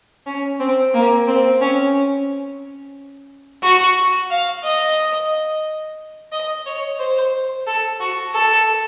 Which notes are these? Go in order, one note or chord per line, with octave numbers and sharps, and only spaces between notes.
C#4
C4
A#3
C4
C#4
F#4
F5
D#5
D#5
C#5
C5
A4
F#4
A4